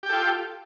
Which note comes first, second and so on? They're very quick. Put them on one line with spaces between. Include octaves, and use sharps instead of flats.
G4 G5 A4 F4